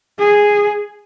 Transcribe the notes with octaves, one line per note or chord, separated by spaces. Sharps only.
G#4